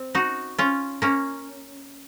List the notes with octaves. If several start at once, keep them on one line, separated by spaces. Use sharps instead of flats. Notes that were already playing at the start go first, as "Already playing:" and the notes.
Already playing: C4
D#4 F#4
C#4 F4
A#3 C#4